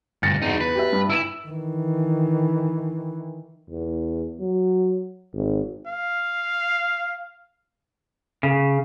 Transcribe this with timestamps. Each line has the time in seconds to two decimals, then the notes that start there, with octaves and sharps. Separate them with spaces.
0.23 D2 G2 A6 A#6 C#7
0.42 E2 D#4 F#4
0.60 B4
0.75 G4 E5
0.93 G2
1.10 E4 E6 D7 E7
1.46 D#3 E3
3.70 E2
4.40 F#3
5.33 G#1
5.87 F5
8.43 C#3